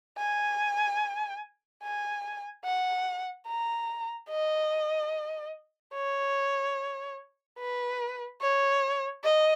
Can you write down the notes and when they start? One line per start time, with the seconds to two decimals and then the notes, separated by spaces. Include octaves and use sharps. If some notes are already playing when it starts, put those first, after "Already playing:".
0.19 G#5
1.84 G#5
2.65 F#5
3.48 A#5
4.30 D#5
5.94 C#5
7.59 B4
8.42 C#5
9.24 D#5